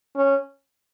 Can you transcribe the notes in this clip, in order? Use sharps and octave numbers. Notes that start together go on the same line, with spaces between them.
C#4